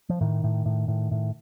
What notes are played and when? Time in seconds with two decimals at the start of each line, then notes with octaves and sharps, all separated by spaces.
0.09 F3
0.21 A2 D#3
0.44 A2
0.65 A2
0.88 A2
1.11 A2